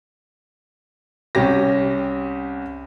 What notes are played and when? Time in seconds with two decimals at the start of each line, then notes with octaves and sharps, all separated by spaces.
1.35 C2 C#4 G4 A#6